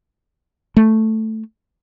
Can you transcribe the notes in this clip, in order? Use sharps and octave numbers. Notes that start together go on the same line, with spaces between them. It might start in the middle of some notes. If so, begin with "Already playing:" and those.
A3